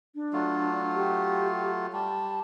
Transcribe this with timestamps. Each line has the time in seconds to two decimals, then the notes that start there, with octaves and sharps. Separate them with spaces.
0.15 D4
0.33 F#3 A3 F4
0.95 G4
1.93 G3 A5